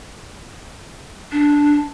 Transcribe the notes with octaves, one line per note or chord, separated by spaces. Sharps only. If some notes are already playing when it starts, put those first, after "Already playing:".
D4